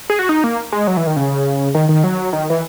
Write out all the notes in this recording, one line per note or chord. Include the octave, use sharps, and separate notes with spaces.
G#4
F#4
D#4
A#3
G#3
F#3
E3
D#3
C#3
D#3
D#3
F#3
D#3
E3